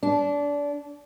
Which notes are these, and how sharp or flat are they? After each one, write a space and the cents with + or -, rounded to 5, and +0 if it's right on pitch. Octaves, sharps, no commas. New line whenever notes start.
D4 -25